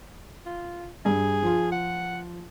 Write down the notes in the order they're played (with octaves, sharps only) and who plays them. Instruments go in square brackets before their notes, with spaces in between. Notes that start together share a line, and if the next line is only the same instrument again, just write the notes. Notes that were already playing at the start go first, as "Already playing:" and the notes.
[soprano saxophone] F4
[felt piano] G2 [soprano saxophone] G#4
[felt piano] F3 F4
[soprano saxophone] F#5